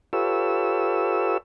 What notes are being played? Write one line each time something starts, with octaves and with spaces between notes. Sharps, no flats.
F4 G4 A4 B4 C#5 E6